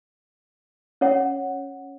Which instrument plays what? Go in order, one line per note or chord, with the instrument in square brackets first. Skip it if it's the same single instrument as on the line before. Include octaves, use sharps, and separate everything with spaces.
[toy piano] C#4 C#5 F#5